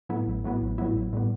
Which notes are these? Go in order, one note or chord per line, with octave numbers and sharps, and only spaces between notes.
A2 F#3 B3 E4
A1
A2 F#3 B3 E4
A1
A2 F#3 B3 E4
A1
A2 G3 B3